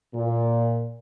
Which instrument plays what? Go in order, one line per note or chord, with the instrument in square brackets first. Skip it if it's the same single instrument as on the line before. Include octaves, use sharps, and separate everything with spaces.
[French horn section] A#2